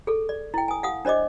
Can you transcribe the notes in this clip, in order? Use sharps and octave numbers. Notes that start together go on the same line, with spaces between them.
G#4 A4
D5
E4 G5
G#5 D#6
F5 F#5 D#6
D4 C5 D5 D#5 D6